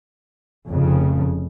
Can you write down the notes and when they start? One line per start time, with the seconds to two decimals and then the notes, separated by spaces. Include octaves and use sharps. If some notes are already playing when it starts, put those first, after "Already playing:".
0.71 F1 F2 C#3